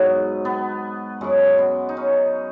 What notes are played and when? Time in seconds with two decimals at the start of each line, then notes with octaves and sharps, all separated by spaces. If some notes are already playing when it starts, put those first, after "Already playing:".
Already playing: G#2 F#3 B3
0.45 B3
1.21 F#2 F#3 G#3
1.58 B3
1.89 D#4
1.97 C#4